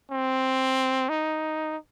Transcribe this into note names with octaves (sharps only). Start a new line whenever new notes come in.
C4
D#4